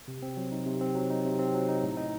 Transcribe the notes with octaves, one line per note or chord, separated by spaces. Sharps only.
C3
C4
F#3
D#4
C3
C4
F#3
D#4
C3
C4
F#3
D#4
A2
D#4